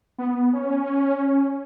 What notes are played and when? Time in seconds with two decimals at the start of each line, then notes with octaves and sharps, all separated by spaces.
0.18 B3
0.53 C#4